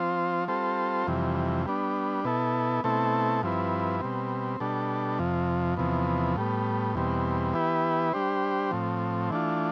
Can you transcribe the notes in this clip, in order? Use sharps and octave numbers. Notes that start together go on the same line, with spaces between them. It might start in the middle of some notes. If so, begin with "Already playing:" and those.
Already playing: F3 C4 F4 C5
G3 C4 F4 A4 C5
F2 C3 E3 G3
G3 B3 D4
B2 B3 E4 A4
B2 A3 C4 E4 A4
G2 F3 C4 E4 B4
B2 G3 C4
B2 G3 D4 A4
F2 C3 F3
E2 C3 F3 B3
A2 G3 B3
E2 B2 G3 C4
E3 B3 E4 G4 B4
G3 D4 G4 C5
A2 F3 C4
E3 A3 D4 F4